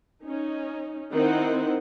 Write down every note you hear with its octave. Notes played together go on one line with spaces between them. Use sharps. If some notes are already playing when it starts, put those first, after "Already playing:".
C#4 D#4
D#3 C4 D#4 E4 C5 F#5